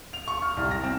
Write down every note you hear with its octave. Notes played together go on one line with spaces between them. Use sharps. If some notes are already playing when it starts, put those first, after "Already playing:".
F7
C#6
F6
C2
A#6
C4